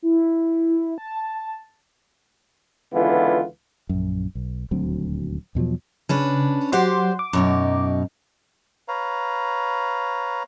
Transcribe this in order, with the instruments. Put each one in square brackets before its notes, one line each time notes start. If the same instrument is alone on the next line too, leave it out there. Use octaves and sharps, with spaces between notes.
[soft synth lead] E4
A5
[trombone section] C#2 D3 E3 B3 F4
[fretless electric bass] A#1 F#2
B1
D#1 D2 F#3 C4
E2 B2 F3 F#3
[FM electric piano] C#3 [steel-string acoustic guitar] C#4 D4 B4
[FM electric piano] F#3 F#5 C6 [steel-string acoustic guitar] G4 C5 D5
[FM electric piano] D6
[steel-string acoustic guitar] F#2 B2 D#4
[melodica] B4 C#5 F5 A#5